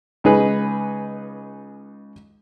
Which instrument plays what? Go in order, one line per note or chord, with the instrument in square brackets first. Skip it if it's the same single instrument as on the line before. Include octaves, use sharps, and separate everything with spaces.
[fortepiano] C#2 D#4 G#4 B4